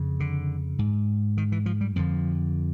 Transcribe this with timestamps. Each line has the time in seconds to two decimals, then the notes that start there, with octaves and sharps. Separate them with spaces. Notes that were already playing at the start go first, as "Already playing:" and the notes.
Already playing: F2 C#3
0.20 D3
0.79 G#2
1.37 D#3
1.52 E3
1.66 F3
1.81 G3
1.96 F2 D3 F3